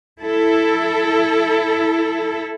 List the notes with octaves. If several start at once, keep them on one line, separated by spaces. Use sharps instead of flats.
E4 A4